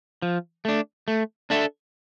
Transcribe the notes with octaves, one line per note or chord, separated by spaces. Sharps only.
F3
A3 D4
A3
D4 A4 E5